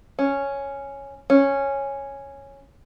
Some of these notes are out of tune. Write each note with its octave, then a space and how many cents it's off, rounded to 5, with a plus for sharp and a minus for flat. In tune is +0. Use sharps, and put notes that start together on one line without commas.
C#4 +0
C#4 -5